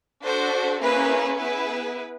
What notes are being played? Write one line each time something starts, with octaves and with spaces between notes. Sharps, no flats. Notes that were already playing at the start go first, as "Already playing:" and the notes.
D4 F#4 A4 C5
A#3 C#4 E4 G#4 B4
B3 E4 G#4 B4